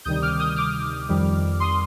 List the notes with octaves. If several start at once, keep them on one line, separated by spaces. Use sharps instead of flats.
D2 C3 D#3 G3 D#6 G6
D#6
D6 F6
D#6 G6
D6 F6
F2 D#3 G3
C6 D#6